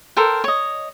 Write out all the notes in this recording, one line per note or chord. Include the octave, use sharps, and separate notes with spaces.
A4 A#4 C5 G5
C#5 D#5